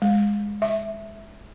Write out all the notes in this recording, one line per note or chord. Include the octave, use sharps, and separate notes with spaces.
G#3
E5